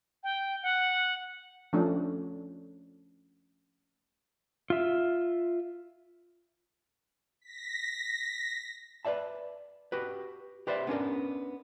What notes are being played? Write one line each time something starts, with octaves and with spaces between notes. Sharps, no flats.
G5
F#5
F3 A3 C#4 D4
F4 E5
A#6 B6
B4 C5 D5 E5 A5
F#4 G4 B4
G4 B4 C5 D5 E5
B3 C#4 D4 A#4